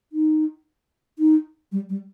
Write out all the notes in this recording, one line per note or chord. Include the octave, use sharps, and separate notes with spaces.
D#4
D#4
G3
G3